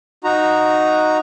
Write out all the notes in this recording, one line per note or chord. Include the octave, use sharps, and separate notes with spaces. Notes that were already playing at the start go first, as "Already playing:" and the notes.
D#4 F#4 A#5